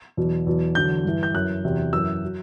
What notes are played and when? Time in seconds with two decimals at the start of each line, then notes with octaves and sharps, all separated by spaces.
0.17 E2 B2 F#3
0.47 E2 B2 F#3
0.75 E2 D3 F#3 G6
1.05 G2 E3
1.23 G6
1.34 F#2 E3 F#6
1.64 E2 C3 F#3
1.92 F#2 E3 E6
2.24 F#3